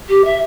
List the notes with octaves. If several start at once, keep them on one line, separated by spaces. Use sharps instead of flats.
G4
E5